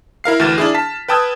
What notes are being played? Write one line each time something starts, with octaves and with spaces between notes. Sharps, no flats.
E4 A#4 F5 C7
D2 E3 F6 A6 E7
D4 E4 G#4
A5 B6
B4 G5 A5 D#6 E6 G#6